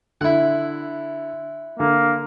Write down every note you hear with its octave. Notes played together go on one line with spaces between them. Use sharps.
D3 E4 F#5
D3 A#3